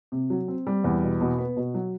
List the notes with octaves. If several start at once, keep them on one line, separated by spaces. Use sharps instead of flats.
C3
F#3
C4
G3
E2
B2
B2
B3
B2
F#3